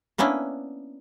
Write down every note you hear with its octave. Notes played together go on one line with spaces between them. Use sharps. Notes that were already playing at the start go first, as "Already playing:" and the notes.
A#3 B3 C#4 D4 E4